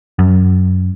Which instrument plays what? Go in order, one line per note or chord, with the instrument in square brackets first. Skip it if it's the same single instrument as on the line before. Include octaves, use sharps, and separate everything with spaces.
[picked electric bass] F#2